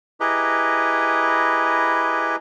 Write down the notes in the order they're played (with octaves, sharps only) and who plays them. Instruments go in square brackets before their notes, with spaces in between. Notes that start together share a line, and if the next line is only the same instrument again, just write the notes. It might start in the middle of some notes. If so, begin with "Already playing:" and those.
[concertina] E4 G4 G#4 B4 D#5 A#5